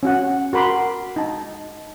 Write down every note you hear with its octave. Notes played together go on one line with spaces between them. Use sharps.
C#4 F#4 F#5
F#4 A#4 B5 C6 D6
D#4 A5